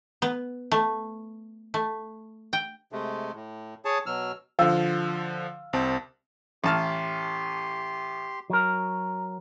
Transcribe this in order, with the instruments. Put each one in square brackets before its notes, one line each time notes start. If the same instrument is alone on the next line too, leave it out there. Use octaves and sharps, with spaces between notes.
[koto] B3
A3
A3
G5
[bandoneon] C3 G#3 A3
A2
G#4 C#5 A5
B2 F#3 E6 F6
[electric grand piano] D3 F3 [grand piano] F5 E6
[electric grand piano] C2 C4 A5
[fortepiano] A1 A5 F6 [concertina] G4 C6
[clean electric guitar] F#3 A#4